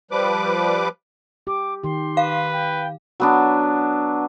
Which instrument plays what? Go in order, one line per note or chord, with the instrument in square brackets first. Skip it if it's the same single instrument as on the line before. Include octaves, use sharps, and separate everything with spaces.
[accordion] F3 G3 B4 D6
[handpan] G4 [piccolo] D6
[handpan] D#3 G4 [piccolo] C6
[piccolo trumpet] B4 [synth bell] F5
[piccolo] G5
[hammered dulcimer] F#3 B3 D4